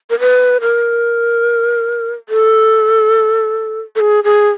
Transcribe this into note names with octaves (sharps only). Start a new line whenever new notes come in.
A#4
B4
A#4
A4
A4
G#4
G#4